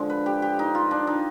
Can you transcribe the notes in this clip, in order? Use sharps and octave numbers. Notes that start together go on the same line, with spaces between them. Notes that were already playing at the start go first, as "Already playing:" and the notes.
Already playing: D3 F3 G#3
B4
G4
G4
D#4
F4
D4
D#4